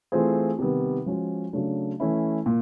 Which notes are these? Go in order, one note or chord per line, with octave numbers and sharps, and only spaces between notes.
E3 A3 C4 F4 G#4
C3 D#3 G3 B3
F3 G#3 C#4 F#4
C#3 F#3 A3 D4
E3 A3 C#4 E4
A#2